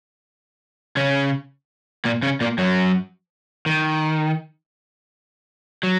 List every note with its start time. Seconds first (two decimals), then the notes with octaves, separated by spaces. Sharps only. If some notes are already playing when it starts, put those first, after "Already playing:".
0.97 C#3 C#4
2.05 A#2 A#3
2.23 C#3 C#4
2.41 A#2 A#3
2.58 F#2 F#3
3.66 D#3
5.83 F#3